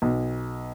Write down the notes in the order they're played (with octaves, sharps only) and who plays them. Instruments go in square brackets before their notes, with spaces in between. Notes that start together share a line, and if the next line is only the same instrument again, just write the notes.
[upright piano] B1